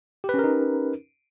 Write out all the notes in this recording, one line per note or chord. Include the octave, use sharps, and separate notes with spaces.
C#4 D#4 G4 A#4 B4